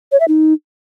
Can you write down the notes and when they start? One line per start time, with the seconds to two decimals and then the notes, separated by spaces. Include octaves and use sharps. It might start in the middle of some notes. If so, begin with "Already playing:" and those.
0.12 C#5
0.20 E5
0.28 D#4